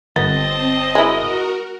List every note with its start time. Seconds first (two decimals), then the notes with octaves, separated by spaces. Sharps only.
0.16 G1 B3 C4 D#5 A5 A6
0.95 G#3 E4 F#4 A#4